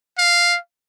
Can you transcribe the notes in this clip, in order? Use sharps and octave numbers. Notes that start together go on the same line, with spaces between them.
F5